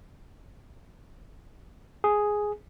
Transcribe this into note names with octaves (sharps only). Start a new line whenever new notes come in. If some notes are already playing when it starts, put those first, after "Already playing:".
G#4